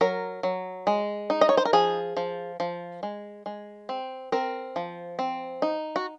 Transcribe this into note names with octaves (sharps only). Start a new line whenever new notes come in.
F#3 A#4
F#3
G#3
D#4
D#5
C#5
C5
A#4
F3 G#4
F3
F3
G#3
G#3
C4
C4 A#4
F3
C4
D#4
F#4